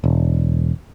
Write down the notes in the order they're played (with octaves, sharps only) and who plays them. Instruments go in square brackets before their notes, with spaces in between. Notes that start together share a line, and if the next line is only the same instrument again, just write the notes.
[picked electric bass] E1